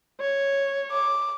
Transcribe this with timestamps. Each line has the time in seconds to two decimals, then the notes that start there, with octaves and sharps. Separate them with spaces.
0.21 C#5
0.92 D6